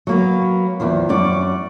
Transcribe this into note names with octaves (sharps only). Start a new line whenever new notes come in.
F#3 A#3 B3
E2 D#3 F3
F#2 C#4 D5 F#5